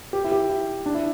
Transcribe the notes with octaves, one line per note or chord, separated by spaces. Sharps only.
G4
E4
G4
E4
D4
E4